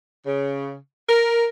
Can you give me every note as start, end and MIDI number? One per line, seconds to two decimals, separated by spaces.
0.24 0.74 49
1.07 1.46 70